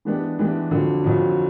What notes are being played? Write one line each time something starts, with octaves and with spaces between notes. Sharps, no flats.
E3 G#3 B3 D4 G4
E3 G#3 B3 D4 G4
F2 D3 F#3
F2 D3 F#3